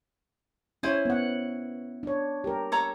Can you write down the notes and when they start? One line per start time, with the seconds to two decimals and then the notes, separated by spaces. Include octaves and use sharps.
0.83 C#4 E4 C5 C#5 G#5
1.05 B3 F#5
2.03 D4 C#5
2.44 G4 A#4
2.72 A4 C#5 A#5